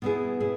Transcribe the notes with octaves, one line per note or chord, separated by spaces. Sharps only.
B2 B3 E4 G#4
E4 G#4